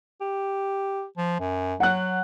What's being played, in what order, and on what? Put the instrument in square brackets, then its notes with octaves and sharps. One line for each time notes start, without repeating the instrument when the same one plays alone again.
[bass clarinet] G4
F3
F#2
[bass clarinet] F#3 [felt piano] F#5 F#6